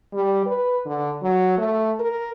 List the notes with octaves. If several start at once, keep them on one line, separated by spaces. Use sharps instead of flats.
G3
B4
D3
F#3
A3
A#4